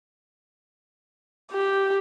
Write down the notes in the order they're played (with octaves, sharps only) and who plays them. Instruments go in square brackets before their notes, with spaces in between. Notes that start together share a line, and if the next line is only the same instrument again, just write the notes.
[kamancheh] G4